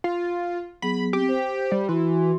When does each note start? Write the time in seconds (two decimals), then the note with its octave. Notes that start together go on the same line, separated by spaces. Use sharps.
0.04 F4
0.82 F#3 B3 G#4 B5
1.13 C4 G4
1.29 C5
1.72 G3
1.89 E3 E4 F#4 C6